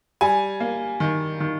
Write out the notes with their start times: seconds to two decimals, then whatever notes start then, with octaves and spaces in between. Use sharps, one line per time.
0.21 G3 G#5
0.60 A#3
1.00 D#3
1.40 D#3